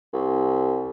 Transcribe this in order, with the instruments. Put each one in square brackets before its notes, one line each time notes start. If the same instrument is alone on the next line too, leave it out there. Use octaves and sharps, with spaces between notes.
[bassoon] C2